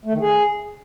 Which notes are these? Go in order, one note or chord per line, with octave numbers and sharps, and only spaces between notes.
A3
D#3
G#4